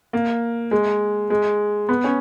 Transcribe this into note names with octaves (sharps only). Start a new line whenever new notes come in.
A#3
G#3
G#3
B3
C#4